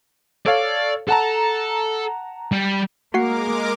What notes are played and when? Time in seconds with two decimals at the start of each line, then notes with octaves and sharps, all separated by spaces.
0.46 A4 C#5 D5 F5
1.09 A4 F#5 A5 A#5
2.52 G3
3.14 G#3 A#3 F#4 A#4 F#5 D6 C7